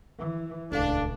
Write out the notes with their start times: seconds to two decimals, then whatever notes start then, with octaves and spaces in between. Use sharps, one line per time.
0.18 E3
0.72 D#1 C#2 A3 D4 A4 F5